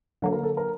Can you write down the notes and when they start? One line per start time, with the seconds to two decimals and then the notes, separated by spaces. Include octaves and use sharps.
0.22 D3 F#3 A#3 A4
0.33 A#4
0.43 A4
0.57 A#4